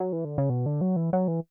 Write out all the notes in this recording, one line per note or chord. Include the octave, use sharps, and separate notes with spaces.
F#3
E3
D3
C#3
B2
D3
F#3
E3
F#3
E3